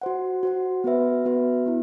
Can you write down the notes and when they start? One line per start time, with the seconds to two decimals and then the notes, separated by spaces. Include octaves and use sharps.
0.01 F#4 C5 F#5
0.43 F#4 C5 F#5
0.84 B3 F#4 B4 E5
1.25 B3 F#4 B4 E5
1.66 B3 E4